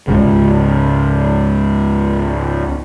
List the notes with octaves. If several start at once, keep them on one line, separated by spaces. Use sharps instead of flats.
C#2 G#2 C#3